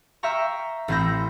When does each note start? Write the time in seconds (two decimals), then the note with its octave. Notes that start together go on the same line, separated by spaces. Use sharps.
0.23 E5 F5 G5 A#5 C#6
0.88 A1 C4 E4 G6 A#6